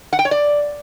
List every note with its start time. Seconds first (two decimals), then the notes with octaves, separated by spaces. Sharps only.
0.13 F#5
0.19 G5
0.25 C#5
0.31 D5